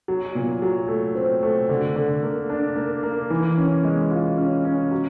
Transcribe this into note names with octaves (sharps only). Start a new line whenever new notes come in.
F#3
A#2
F#3
A3
C4
A3
D3
D3
A#3
D4
A#3
A#3
E3
C#4
G#3
F4
C#4
C#4
F#3